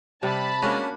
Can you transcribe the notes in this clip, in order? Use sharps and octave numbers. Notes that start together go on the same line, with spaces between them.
C3 G3 A5 B5
G#3 A#3 C#4 D4 F#4